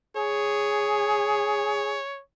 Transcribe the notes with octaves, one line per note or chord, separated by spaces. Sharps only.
G#4 C#5